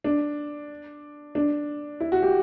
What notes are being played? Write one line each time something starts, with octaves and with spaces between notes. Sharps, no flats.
D4
D4
E4
F#4
G4